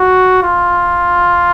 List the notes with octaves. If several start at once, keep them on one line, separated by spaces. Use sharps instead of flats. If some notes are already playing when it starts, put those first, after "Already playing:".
Already playing: F#4
F4